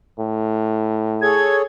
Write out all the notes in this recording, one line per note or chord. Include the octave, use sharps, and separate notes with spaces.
A2
G#4 A4 C#5 G#6